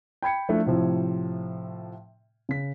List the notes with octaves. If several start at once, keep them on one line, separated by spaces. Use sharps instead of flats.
G5 B5 G#6 C#7
F3 A3 D4 E4
A2 C3 F3
C#3 B6